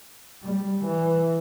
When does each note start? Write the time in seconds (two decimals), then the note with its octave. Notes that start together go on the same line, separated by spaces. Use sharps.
0.43 G3
0.85 E3